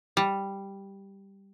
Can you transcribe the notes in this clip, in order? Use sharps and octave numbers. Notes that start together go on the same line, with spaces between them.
G3